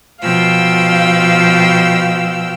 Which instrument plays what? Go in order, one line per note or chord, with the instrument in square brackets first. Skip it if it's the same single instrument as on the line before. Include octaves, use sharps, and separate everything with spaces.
[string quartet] B2 F3 F5 G5 E6